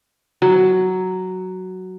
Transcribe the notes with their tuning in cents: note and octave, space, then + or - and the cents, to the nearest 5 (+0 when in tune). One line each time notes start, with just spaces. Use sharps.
F#3 +5